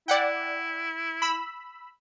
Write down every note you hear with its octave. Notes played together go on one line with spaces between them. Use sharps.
E4 D5 F#5 G5
B5 E6